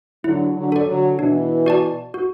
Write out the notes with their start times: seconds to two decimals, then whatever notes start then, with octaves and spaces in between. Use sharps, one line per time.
0.24 D3 F#3 E4
0.56 D3 F#3
0.72 A4 D5
0.88 D3 F#3
1.19 B2 E3 D4
1.66 F#4 D5 A5
2.14 F#4